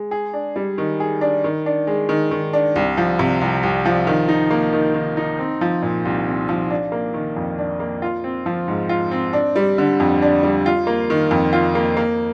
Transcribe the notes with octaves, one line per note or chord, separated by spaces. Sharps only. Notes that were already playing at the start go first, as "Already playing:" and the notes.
Already playing: G#3
G#4
D4
G3
D#3
G#4
D4
D#3
D4
G#3
D#3
D#3
D4
C2
F3
C3
C2
C2
F3
D#3
D#4
A#3
D#3
D#3
D#4
C4
F3
A#2
C2
C4
F3
D4
A#3
D#3
F2
D4
A#3
F4
C4
F3
G#2
F4
C4
D4
G3
D3
F2
D4
G3
F4
A#3
D#3
F2
F4
A#3
A#3